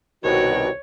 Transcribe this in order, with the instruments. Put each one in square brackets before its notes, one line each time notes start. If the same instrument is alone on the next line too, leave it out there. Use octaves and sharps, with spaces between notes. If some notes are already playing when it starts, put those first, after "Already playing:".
[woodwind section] C2 B2 D#3 [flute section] F#4 G5 [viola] C#5